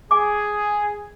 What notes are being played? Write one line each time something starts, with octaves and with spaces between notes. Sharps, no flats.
G#4 G#5 D6